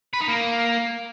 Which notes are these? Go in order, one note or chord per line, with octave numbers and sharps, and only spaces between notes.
B4
D#4
A#3